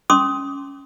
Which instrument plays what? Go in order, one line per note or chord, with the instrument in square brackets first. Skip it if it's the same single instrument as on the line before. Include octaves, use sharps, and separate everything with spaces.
[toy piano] C#4 C6 D6 D#6